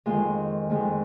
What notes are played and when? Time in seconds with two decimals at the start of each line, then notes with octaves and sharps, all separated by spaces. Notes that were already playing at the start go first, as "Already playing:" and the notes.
0.06 F2 D#3 G#3 F4
0.70 F2 D#3 G#3